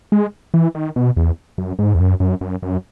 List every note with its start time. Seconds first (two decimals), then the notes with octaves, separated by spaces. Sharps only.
0.12 G#3
0.54 E3
0.75 D#3
0.96 B2
1.17 E2
1.58 F#2
1.79 G#2
1.95 E2
2.00 F#2
2.20 F#2
2.41 F#2
2.63 F#2